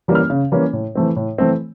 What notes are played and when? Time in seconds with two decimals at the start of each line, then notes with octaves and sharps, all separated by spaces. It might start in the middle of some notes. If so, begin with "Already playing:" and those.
0.08 E3 G3 A#3 C#4
0.15 F6
0.30 C#3
0.52 E3 G3 A#3 C#4
0.73 A2
0.95 E3 A3 C4
1.16 A2
1.38 E3 A3 C4